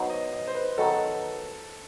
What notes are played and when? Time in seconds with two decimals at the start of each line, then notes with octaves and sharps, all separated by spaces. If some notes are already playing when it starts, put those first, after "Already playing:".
Already playing: F#3 B3 D#4 C5
0.10 D#5
0.33 D#5
0.47 C5
0.55 B4
0.78 D#3 F#3 B3 D#4 F#4 A4